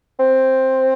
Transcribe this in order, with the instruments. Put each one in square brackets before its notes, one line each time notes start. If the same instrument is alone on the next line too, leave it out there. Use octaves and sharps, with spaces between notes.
[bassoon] C4